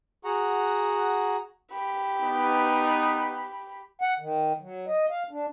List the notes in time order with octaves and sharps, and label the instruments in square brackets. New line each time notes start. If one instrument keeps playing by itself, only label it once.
[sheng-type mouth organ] F#4 G#4 F#5 A#5
[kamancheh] G4 B5
[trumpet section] B3 D#4
[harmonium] F#5
D#3
F#3
D#5
F5
D4